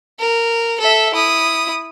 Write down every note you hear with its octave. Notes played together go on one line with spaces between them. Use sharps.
A#4
A4 E5
E4 D#6